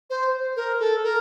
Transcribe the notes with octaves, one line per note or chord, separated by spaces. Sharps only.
C5
A#4
A4
A#4